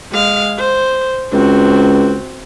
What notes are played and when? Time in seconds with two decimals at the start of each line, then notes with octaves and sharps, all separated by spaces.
0.12 G#3 F5
0.58 C5
1.32 C#2 C4 F#4